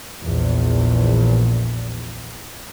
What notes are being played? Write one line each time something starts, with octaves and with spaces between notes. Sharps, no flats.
A#1 E2